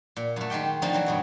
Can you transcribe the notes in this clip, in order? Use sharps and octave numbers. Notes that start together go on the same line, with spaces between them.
A#2
F#2 A3
D#3 G#3 G4 G5
D3 F3 A3 C4 D#4
E3 F#3 C4
G2 B2 F#3